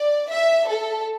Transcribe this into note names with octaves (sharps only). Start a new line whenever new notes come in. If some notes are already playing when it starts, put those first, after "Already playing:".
Already playing: D5
E5
A4